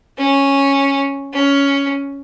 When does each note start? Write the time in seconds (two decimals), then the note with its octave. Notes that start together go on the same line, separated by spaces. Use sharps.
0.18 C#4
1.33 C#4